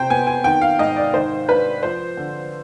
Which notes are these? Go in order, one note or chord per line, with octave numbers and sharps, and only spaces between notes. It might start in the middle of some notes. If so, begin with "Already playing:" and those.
Already playing: C3 C5 G5
B3 G#5
G#5
D#3 G5
F5
G#2 D#5
D5
D#3 C5
D4 B4
F3 C5
D3